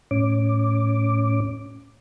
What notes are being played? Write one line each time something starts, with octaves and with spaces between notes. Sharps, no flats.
A2 C#4 D6